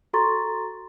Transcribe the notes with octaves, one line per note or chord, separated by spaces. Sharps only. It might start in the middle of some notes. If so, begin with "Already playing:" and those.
F#4 A4 A#5 C6 C#6 A6